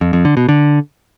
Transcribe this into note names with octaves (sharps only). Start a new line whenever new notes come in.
F2
F2
D3
B2
D3